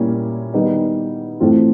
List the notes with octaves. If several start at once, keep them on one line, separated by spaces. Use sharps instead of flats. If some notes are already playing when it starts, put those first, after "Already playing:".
Already playing: A#2 G3 A#3 C#4 E4
D#3 G3 B3 D#4
A2 E3 A3 C4 F4